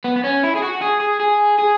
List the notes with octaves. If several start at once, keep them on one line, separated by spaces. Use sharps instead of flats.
B3
B3
C#4
E4
G#4
F#4
G#4
G#4
G#4
G#4